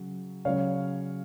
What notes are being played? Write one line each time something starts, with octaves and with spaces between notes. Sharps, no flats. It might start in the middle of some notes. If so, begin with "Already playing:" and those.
Already playing: C#3 F#3
C#3 F#3 C#5 F5